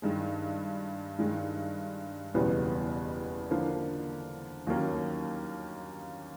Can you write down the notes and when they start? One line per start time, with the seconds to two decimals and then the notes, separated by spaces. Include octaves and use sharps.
0.02 G2 D#3 G#3
1.18 G2 D#3 G#3
2.34 F#1 E2 B2 G3 B3
3.50 D3 F3 A#3
4.67 D#2 D#3 F#3 A#3 C#4